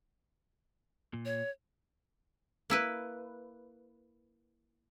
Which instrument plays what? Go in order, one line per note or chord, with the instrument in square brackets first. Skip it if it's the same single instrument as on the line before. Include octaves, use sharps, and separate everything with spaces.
[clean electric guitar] A#2
[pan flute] C#5
[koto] A#3 E4 B4